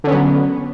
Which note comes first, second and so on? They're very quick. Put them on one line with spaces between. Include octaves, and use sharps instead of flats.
D3 C#4 B3 F#3